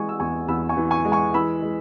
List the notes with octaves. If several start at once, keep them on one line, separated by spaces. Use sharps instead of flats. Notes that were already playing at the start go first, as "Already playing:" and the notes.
Already playing: E3 G#3 G#5 C#6
E6
E2 G#5 C#6
E2 B5 E6
G#5 C#6
E3
G#5 C#6
G#3
G#5 C#6
E3 B5 E6
G#3